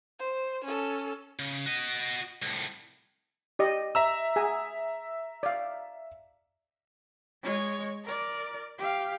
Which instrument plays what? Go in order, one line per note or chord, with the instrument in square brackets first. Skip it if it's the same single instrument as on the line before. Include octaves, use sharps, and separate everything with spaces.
[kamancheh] C5
C#4 A4
[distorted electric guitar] C#3
F#4 D#5
C2 A2
[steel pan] G4 D5 D#5
[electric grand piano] E5 A#5 E6
[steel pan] G#4 F#5 G#5
D5 F5
[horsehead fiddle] G#3 C#5
A#4 D5
G4 F5